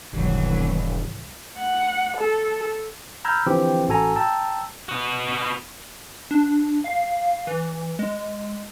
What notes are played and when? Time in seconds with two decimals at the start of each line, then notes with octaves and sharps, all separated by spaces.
0.13 E1 C2 G#2 D#3 E3 F#3 G3
1.58 F#5
2.17 A4
3.25 A#5 B5 E6 F6 G6 G#6
3.47 D3 E3 F3 C4 G4
3.88 A1 F#4 A4 G#5 A#5
4.16 G5 A5 A#5 E6
4.89 B3 F#4
6.31 D4
6.84 F5
7.47 E3
7.99 G#3